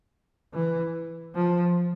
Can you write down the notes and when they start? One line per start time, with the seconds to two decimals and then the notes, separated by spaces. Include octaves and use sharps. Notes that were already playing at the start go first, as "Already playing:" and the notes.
0.54 E3
1.35 F3